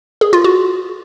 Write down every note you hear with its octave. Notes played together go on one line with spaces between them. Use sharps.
G#4
F4
F#4